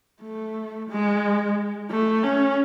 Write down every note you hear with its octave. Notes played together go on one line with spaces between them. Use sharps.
A3
G#3
A3
C#4